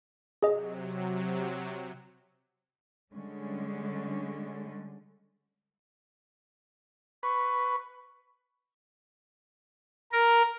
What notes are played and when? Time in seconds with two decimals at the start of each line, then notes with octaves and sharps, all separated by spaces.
0.43 C3 F#3 G#4 D#5
3.14 D3 G3 G#3 C#4
7.23 B4 C#6
10.12 A#4